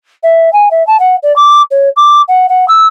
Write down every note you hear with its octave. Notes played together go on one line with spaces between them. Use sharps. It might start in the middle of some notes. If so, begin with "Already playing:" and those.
E5
G#5
E5
A5
F#5
D5
D6
C#5
D6
F#5
F#5
E6